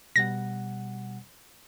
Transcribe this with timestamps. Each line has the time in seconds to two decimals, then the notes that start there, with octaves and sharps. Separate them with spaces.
0.16 B2 G3 F#5 A#6